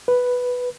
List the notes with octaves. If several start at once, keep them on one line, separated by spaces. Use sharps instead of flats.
B4